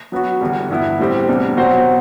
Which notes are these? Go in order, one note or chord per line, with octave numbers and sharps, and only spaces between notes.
F#3 B3 F#4
E2 D3 G3
G2 E3 B3 E4
A2 G3 C4 G4
E2 C3 G3 D4
B2 F#3 C4 F#4 C5